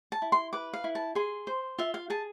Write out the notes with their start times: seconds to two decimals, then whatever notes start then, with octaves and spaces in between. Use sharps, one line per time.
0.12 A5
0.22 E4
0.32 C6
0.53 B4 D6
0.74 F5
0.84 E4
0.95 A5
1.15 G#4 C6
1.47 C5
1.78 F4 E5
1.94 F5
2.10 G#4 A5